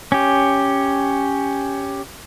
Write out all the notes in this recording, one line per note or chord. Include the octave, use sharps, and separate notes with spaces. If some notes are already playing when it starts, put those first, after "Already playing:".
C#4 G4